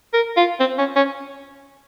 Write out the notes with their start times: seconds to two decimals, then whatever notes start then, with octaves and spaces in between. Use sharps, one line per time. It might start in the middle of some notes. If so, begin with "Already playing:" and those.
0.13 A#4
0.37 F4
0.60 C4
0.78 C#4
0.96 C#4